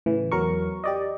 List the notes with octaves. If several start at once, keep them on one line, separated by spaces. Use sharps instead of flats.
A2 C#3 E3
E2 F#3 A#4 C#6
G4 D5 D#5